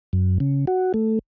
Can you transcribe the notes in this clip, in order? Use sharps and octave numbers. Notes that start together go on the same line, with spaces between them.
F#2
C#3
F#4
A3